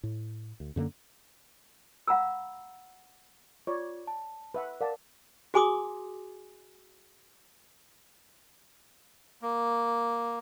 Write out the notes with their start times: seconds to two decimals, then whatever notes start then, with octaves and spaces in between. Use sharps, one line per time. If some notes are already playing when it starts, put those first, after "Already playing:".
0.03 A2
0.60 D2
0.76 F#2 D3 G#3 A#3
2.08 F5 F#5 A#5 B5 E6
3.67 F4 C#5 D5
4.07 A5
4.54 B4 E5 F#5
4.81 A#4 D5 F5 F#5 A5
5.54 F#4 G#4 G#5 C6 D6 D#6
9.42 A#3